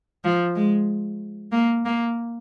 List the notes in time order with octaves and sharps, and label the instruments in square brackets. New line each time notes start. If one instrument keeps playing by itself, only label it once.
[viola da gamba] F3
G#3
A#3
A#3